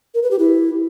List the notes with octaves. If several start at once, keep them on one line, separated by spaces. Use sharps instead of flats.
A#4
B4
G4
E4